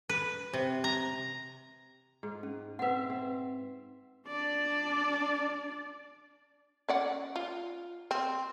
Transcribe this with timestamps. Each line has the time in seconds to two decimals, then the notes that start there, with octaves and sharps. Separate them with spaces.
0.09 B4
0.53 C3
0.84 A#5
2.23 G#2
2.43 C#4
2.79 C4 B4 E5 F#5
3.10 C4
4.27 D4 D5
6.89 C#4 D5 F#5
7.36 F4
8.11 C4